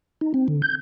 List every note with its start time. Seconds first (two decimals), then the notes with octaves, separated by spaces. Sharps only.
0.21 D#4
0.34 C4
0.48 D3
0.62 G6